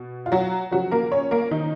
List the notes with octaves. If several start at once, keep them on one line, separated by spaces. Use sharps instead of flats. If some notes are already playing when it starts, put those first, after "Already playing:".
Already playing: B2
F4
F#3 F#4
C#3 F3 F#3 F#4
A#3 A#4
C#4 C#5
A#3 A#4
D#3 D#4